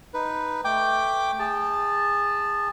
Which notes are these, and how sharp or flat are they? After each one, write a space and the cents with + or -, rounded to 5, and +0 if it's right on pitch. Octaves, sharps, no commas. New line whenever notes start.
D#4 +0 B4 +0
A3 +0 G5 +0 D6 +0
G#4 -25 A5 +0